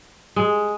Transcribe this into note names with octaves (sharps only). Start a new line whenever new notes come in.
G#3